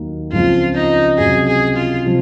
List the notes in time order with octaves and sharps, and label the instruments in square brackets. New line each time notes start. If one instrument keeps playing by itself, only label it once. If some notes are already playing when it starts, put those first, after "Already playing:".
Already playing: [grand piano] D#2 D#3 F#3 A#3 D#4
[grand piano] C#2 C#3 F3 C4 [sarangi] F4
[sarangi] D#4
[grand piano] C#2 C3 F#3 [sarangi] G#4
[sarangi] G#4
F4
[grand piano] C3 F3